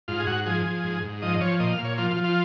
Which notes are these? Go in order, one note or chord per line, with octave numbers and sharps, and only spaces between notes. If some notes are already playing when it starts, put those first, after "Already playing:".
G#2 F4
G#4
G#2 F#4
F3 G#4
F3
G#2
G#2
F3 D#5
F3 C#5
A#2 D#5
F5
A#2
C#5
F3 F4
F4
F3
F4